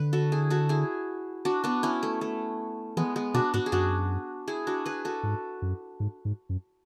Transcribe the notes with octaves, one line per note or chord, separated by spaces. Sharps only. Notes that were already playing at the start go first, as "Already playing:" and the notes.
Already playing: D3 B4
F#4 A4
E4 G#4
F#4 A4
E4 G#4
D4 F#4
B3 D4
C#4 E4
A3
A3
E3 G#3 B3
G#3 B3
B2 D4 F#4
G#2 D4 F#4
G#4
F#2 D4 F#4
E4 G#4
D4 F#4
G#4 B4
F#4 A4
G#2
F#2
G#2
G#2
F#2